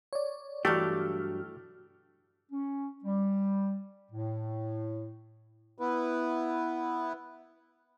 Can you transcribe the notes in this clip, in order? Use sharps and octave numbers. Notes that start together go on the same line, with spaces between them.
C#5 D5
G2 E3 F#3 A3 G4 F6
C#4
G3
A2
B3 E4 B4